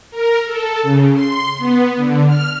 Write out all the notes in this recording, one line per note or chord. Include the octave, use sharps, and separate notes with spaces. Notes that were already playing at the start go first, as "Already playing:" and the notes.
A#4
A4
C#3
C6
B3
D3
F6